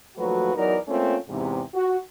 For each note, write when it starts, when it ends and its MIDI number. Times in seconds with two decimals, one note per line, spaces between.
0.17 0.54 39
0.17 0.54 53
0.17 0.54 54
0.17 0.54 57
0.17 0.54 66
0.17 0.54 71
0.55 0.77 40
0.55 0.77 54
0.55 0.77 63
0.55 0.77 66
0.55 0.77 70
0.55 0.77 74
0.87 1.15 57
0.87 1.15 58
0.87 1.15 60
0.87 1.15 61
0.87 1.15 65
1.29 1.61 40
1.29 1.61 44
1.29 1.61 48
1.74 1.96 66